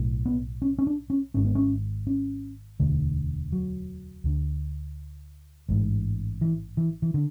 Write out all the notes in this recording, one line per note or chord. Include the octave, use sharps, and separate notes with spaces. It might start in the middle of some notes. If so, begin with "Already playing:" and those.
Already playing: B1 A2
B3
C#4
C#4
D4
C#4
G#1 G#2 C#4
B3
C#4
C#4
E1 D2 D3
F#3
D2 D3
A1 G#2
E3
E3
E3
D3